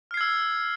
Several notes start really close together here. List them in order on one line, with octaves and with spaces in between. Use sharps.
F6 C7 G#6 E6